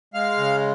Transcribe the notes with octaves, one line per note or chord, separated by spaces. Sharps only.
G#3 F5 F6
C#3